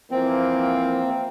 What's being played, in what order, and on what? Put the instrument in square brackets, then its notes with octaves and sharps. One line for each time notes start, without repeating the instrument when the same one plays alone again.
[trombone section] E3 F3 A#3 [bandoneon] C4